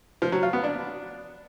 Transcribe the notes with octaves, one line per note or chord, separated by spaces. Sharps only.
F3
F#3
F4
B3
D4